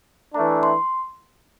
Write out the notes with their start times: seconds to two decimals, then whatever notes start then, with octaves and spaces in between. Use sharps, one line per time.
0.34 E3 A3 D4 A#5
0.63 C6